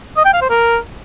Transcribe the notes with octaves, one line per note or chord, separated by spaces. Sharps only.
D#5
G5
F5
C5
A#4